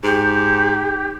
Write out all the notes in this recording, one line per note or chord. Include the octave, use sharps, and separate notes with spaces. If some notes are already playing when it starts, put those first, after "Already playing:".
G#2 G4